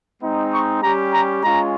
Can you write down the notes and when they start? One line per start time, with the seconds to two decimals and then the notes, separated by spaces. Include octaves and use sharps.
0.21 G#3 C4 D#4
0.51 C#6
0.82 G3 C#4 G4 A#5
1.12 A#5
1.42 G#3 C#4 F4 A#5